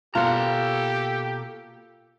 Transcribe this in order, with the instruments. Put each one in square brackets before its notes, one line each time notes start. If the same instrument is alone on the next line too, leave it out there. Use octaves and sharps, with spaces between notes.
[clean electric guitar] B2 A#3 [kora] F4 F#5 [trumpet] G4 [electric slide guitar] A4 A#5